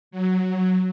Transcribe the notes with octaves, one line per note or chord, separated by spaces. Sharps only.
F#3